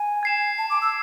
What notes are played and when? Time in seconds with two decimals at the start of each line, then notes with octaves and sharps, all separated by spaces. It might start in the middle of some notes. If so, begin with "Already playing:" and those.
Already playing: G#5
0.23 G#6 C7 E7
0.58 A5
0.70 D6
0.82 E6